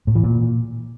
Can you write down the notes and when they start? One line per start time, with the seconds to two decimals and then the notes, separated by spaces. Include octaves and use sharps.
0.07 A2
0.15 E3
0.23 A#2